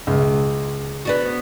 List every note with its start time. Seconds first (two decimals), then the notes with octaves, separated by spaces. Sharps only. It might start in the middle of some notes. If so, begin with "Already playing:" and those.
0.07 C#2
1.05 B3 D4 F#4